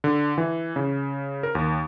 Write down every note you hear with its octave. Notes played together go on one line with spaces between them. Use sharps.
D3
E3
C#3
A#4
D#2